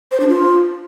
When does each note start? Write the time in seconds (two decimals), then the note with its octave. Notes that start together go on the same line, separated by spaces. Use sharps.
0.11 C5
0.20 D4
0.29 F4